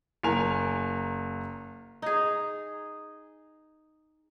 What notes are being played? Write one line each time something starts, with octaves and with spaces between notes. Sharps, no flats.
F#1 A#4 G#5 F7
D#4 G#4